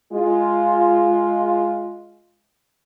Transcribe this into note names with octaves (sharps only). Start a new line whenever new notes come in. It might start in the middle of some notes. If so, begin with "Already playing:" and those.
G#3 F4